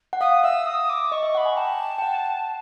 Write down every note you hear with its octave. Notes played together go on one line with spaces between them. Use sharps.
F#5
F5 D#6
E5 E6
D#6
D6
D#5 C#6
E5
F#5 B5 C#6
G#5
G5 A5
G5
F#5